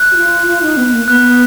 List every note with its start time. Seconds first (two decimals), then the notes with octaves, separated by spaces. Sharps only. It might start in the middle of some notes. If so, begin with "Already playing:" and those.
Already playing: F#6
0.12 F#4
0.16 F4
0.47 F4
0.62 D#4
0.77 B3
0.93 A#3
1.08 B3 F#6